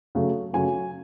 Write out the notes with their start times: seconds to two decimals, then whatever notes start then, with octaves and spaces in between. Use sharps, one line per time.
0.15 C#3 F#3 A3
0.53 C#3 F#3 A3 G#5